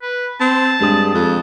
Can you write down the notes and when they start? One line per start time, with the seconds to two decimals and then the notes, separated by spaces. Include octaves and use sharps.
0.02 B4
0.41 C4 A5
0.81 G2 G#3 G#4 D#6
1.14 F2